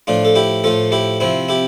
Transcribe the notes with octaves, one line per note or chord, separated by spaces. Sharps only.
A2 F3 D4 F4
A4
E4 G4
A2 F3 F4 A4
E4 G4
C3 F3 C4 E4
E4 G4